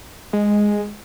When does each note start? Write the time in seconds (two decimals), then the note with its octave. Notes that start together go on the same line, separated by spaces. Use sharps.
0.33 G#3